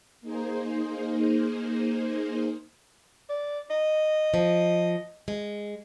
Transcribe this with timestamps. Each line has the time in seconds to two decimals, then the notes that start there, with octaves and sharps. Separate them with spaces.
0.21 A#3 D#4 G#4 C5
3.29 D5
3.70 D#5
4.34 F3
5.28 G#3